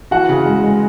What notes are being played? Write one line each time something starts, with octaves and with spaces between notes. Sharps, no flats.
E3 F#4 F#5
C#3
G#3
G#3